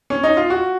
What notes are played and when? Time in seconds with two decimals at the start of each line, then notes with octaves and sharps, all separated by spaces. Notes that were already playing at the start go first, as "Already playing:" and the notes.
0.10 C#4
0.23 D#4
0.37 F4
0.50 F#4